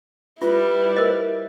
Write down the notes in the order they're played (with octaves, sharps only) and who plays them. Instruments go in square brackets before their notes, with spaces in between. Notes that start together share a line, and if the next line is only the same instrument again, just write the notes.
[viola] G3 E4 [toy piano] F4 [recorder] B4
[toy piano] A#4 C5 D#5